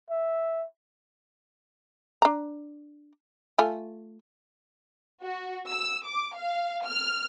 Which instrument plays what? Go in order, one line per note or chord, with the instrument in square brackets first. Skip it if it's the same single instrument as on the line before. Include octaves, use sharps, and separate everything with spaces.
[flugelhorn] E5
[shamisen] D4 A#5
A3 F4 G#5
[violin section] F#4
E6
D6
F5
F6